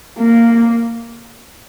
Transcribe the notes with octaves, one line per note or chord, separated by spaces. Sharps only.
A#3